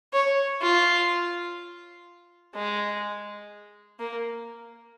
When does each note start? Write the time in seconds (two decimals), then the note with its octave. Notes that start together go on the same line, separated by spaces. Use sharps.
0.13 C#5
0.62 F4
2.55 G#3
3.99 A#3